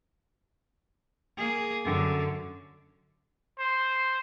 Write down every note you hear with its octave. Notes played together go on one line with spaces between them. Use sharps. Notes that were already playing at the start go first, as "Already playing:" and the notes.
A#3 G#4
F#2 D3
C5